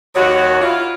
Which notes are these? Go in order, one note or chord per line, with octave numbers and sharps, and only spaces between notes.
D#2 F#4 C#5
E4 F4